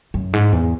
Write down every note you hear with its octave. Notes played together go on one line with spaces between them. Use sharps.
F#2
G#2
E2